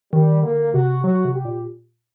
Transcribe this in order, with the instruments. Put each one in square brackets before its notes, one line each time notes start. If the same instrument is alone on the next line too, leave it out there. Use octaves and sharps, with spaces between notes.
[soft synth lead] D#3 [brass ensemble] G3
[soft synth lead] D3 [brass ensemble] A#3
[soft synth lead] C3 [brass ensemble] F#4
[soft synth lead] F#3 [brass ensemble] F#4
[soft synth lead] C3
[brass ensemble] G4
[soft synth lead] A#2